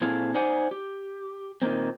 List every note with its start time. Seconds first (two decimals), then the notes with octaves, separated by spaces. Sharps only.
0.01 A#2 C4 E4 G#4 A4 F5
0.34 D#4 C5 D5 F#5 G#5
0.71 G4
1.62 A#2 D#3 E3 A#3 C4